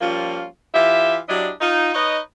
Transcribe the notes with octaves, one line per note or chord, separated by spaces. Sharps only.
F3 G3 A#3 C#4 F4
E3 F4 G4 E5
F#3 D4 E4 G4 D5 D#5
D#4 F4
D#4 B4 C#5 D#5